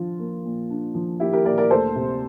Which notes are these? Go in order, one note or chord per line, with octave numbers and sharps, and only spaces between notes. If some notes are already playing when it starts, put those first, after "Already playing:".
Already playing: F3 D4 F4
A#3
A#2
D4
F3
A#3 E4 G4
G4 A#4
A#2 A#4 D5
A#4 D5
D2 A4 C5
C3